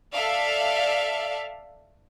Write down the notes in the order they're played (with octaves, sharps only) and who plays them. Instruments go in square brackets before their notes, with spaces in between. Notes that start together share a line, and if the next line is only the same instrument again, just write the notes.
[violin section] A4 D5 E5 F5